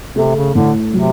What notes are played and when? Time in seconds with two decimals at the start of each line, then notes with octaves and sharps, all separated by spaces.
0.16 C3 A3
0.36 C#3
0.54 A2 D3
0.93 C3 F#3